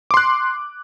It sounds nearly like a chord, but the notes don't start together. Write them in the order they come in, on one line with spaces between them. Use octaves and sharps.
D6 C6 F#6